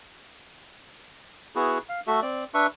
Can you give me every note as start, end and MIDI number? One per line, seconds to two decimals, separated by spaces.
1.56 1.78 59
1.56 1.78 64
1.56 1.78 66
1.56 1.78 68
1.89 2.00 77
2.07 2.21 57
2.07 2.21 66
2.07 2.21 69
2.07 2.21 76
2.22 2.44 60
2.22 2.44 74
2.54 2.67 62
2.54 2.67 71
2.54 2.67 76
2.54 2.67 85